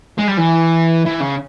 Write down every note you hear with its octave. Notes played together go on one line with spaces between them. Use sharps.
G#3
G3
E3
E3
C#3